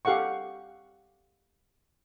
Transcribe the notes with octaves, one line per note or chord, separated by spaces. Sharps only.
G4 A4 F5 F#5 C#6